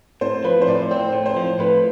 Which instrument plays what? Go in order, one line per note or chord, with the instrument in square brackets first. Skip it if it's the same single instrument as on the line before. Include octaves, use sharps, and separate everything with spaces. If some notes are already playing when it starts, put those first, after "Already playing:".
[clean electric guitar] A2 [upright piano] C5
[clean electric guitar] F3 [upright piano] B4
[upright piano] C5
[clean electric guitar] A2 [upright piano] D5
[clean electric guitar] C4 [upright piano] C5
[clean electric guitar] A2
[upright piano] C5
[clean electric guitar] F3
[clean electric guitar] A2 [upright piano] B4